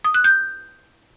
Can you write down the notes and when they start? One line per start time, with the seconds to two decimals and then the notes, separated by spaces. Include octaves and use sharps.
0.05 D#6
0.14 F#6
0.24 G6